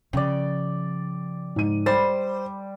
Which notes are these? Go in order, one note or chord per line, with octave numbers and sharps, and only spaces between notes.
C#3 F3 D5 G5
G#2 D#7
G3 C5 A6